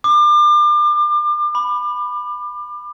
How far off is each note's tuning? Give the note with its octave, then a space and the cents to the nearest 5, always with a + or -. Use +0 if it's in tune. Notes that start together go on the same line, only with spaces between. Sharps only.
D6 +35
D6 +25
B5 +5